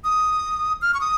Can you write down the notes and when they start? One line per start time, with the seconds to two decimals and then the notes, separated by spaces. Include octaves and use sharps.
0.04 D#6
0.82 F6
0.94 C#6
1.01 D#6